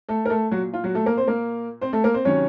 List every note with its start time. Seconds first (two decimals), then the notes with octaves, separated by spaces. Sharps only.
0.09 A3 A4
0.26 A#4
0.29 A3 A4
0.51 A#2 F#3 F#4
0.74 F4
0.84 F#3 F#4
0.95 A3 A4
1.06 A#3 A#4
1.17 C4 C5
1.27 A#3 A#4
1.81 C4 C5
1.93 A3 A4
2.04 A#3 A#4
2.14 C4 C5
2.25 C3 D#3 F#3 C#4 C#5